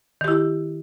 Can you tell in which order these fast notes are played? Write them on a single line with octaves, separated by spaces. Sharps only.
D#3 G4 E4